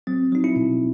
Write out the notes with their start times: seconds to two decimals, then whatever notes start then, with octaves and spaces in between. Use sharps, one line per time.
0.07 F#3 C4
0.32 F#3 D#4
0.44 E4
0.56 B2